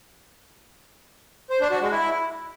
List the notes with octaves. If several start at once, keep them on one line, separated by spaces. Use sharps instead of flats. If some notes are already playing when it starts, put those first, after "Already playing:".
C5
D4
F#4
G#3
E4